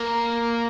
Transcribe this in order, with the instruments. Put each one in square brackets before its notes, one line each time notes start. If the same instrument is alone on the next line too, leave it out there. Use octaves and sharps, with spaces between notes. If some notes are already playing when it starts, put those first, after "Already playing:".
Already playing: [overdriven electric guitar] A#3 [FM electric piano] A#5